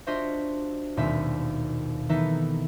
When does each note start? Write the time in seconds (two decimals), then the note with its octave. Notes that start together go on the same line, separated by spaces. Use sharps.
0.07 D4 F4 F#4 C5 D#5 E5
0.97 D#1 D#2 B2 C4 E5
2.09 D#3 E3 B3 D#4 A4 E5